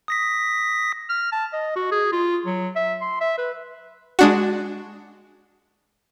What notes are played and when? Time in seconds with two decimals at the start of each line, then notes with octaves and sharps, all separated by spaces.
0.08 D#6 A#6 B6
1.10 F6
1.32 A5
1.53 D#5
1.76 F#4
1.91 G#4
2.12 F4
2.46 F#3
2.76 E5
3.01 C6
3.21 E5
3.38 B4
4.19 G#3 D4 F#4